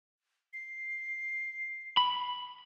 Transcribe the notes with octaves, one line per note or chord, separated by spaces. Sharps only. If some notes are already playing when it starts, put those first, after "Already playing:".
C7
B5